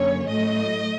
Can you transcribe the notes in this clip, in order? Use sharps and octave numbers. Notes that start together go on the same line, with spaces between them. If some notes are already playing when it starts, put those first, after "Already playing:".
Already playing: F#2 D3 A#3 C#4 C#5
A2 F#3 A3 D#5